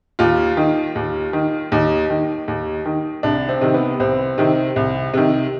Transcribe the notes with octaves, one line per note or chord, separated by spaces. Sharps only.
D#2 F4
D#3
D#2
D#3
D#2 D#4
D#3
D#2
D#3
C2 D4
C4
C3 D#3
B3
C2 C4
C3 D#3
C2
C3 D#3